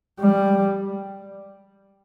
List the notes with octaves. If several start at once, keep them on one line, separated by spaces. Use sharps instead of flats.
G3